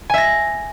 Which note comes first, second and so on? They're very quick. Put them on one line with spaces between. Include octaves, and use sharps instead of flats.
G#5 E5 A#6